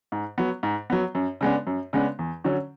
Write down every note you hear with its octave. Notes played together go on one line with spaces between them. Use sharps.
G#2
F#3 B3
G#2
F#3 B3
F#2
C#3 G#3 B3 D4
F#2
C#3 G#3 B3 D4
E2
D3 F#3 C#4